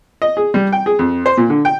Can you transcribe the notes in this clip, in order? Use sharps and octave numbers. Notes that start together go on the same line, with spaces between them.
D#5
G#4
G3
G5
G#4
F2
C5
A#2
D3
G5